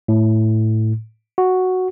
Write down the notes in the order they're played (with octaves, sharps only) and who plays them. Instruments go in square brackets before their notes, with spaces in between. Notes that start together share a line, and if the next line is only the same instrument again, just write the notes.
[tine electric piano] A2
F#4